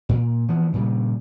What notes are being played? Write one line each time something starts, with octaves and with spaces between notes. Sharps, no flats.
A#2
E3 F3 B3
G2 A#2 C#3 G3